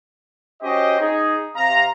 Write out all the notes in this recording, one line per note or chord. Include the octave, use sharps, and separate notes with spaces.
C#4 F#4 G4 C5 D#5
D#4 G#4
C3 F5 A#5